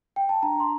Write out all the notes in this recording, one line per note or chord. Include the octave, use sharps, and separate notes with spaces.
G5
A5
D4 A#5
C6